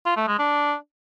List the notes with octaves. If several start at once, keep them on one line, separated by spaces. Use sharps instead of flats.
F4
A3
G#3
D4